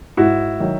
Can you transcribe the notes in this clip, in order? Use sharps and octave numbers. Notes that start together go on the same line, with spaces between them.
G#2 E4 F#4
D#3 F#3